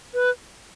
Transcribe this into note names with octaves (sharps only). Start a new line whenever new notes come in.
B4